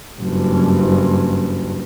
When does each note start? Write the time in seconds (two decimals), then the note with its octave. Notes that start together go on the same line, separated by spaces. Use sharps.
0.21 F#1 G2